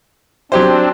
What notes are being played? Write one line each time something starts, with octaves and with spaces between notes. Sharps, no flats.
F#3 C4 D4 G4 C5